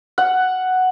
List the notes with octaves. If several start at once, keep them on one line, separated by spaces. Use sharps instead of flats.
F#5